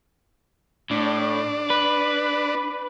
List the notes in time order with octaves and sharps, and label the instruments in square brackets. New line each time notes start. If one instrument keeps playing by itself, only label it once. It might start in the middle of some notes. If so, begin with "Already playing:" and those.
[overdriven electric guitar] A2 [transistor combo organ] D4
[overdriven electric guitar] B4